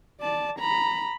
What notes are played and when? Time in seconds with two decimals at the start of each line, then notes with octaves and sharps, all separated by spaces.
0.21 D5 A5
0.59 A#5 B5